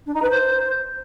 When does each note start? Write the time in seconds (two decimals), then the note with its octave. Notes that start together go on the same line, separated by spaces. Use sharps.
0.06 D4
0.14 D#4
0.22 B4
0.30 C5